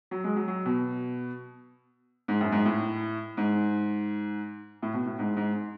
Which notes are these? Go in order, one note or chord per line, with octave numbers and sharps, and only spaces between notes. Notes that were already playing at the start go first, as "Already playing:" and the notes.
F#3
G#3
F#3
F#3
B2
G#2
F#2
G#2
A2
G#2
A2
B2
A2
G#2
G#2